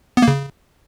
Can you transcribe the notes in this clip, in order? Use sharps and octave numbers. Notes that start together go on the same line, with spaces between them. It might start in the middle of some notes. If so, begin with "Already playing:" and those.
B3
A#3
C#3